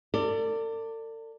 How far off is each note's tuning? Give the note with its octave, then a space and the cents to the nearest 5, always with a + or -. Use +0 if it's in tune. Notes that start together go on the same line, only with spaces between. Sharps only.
A4 +45 D5 +0